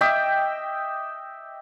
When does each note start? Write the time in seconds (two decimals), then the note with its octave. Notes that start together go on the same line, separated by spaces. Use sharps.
0.01 D#5 E5 G5 D6